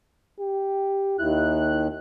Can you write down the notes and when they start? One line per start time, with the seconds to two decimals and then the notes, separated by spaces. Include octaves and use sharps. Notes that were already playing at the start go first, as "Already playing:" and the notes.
0.40 G4
1.19 D#2 E4 F#6